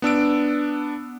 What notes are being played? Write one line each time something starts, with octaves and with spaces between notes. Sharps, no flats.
B3 D4 E6 D7